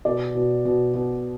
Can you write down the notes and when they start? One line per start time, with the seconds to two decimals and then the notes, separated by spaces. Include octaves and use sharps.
0.05 B2 D5
0.35 B2
0.65 B2
0.94 B2